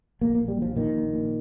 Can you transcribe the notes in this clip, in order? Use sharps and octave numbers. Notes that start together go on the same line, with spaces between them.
A#1 A#3
A#3
A#2
G3
A#1 F3
A#2 D#3
A#1
A#2